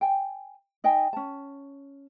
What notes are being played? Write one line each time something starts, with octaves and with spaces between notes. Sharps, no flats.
G5 G#5
D#4 D#5 G5 G#5
C#4 A5